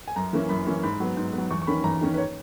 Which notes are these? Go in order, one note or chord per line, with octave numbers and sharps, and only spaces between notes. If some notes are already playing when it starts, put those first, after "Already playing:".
G#5
F#2 A#5
E3 A#3 C#4
F#2 B5
E3 A#3 C#4
G#2 B5
F#3 B3
G#2
F#3 B3
E2 C#6
C#6
D#3 A#3 C#4 B5
E2 A#5
D#3 A#3 C#4
B4
C#5